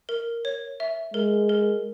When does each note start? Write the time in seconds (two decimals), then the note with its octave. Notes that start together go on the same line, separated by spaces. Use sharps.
0.09 A#4
0.45 C#5
0.80 E5
1.14 G#3 A#4
1.49 A#4